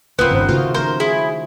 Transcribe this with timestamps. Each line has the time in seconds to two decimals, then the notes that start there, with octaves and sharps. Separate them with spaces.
0.19 D1 C#3 B3 C4 F4 A#4 B4
0.30 G1 D#3 C5
0.49 C#3 A3 F4 F#4
0.75 F3 D#4 A#4 C5
1.00 E4 G#4